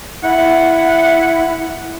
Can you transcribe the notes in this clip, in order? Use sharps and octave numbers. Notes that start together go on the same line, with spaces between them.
E4 F#5